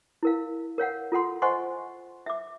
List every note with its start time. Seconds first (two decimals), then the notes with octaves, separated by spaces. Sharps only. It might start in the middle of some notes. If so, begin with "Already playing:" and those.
0.23 E4 A#4 F5
0.78 A#4 C#5 F5 F#5
1.12 F4 A4 F#5 C6
1.42 C5 D#5 F#5 G#5 C6 C#6
2.26 E5 D6